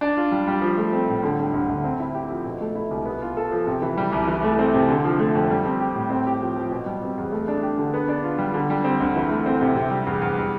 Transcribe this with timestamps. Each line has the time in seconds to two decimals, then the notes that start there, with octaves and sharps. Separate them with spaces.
0.01 D4
0.17 F4
0.32 G3
0.48 G3
0.62 F3
0.77 A3
0.93 C4
1.08 A2
1.23 D3
1.39 G3
1.53 D2
1.69 D2
1.84 C4
2.00 E4
2.15 G4
2.30 F3
2.45 B2
2.61 A3
2.75 E4
2.91 C2
3.05 B3
3.22 F4
3.37 A4
3.52 F3
3.67 C3
3.82 E3
3.98 G3
4.12 C2
4.27 E3
4.44 A3
4.59 C4
4.74 C3
4.89 D3
5.05 F3
5.19 A3
5.35 F2
5.50 G3
5.65 C4
5.81 G4
5.95 A2
6.10 C4
6.26 G4
6.41 F3
6.56 F3
6.71 B2
6.86 G3
7.03 C4
7.18 E2
7.32 A3
7.48 D4
7.63 G4
7.78 D3
7.94 B3
8.08 D4
8.24 F4
8.39 G3
8.54 D3
8.70 G3
8.84 C4
9.00 D2
9.16 E3
9.31 A3
9.46 C4
9.61 C3
9.76 C3
9.91 G3
10.07 E2
10.22 E2
10.37 G3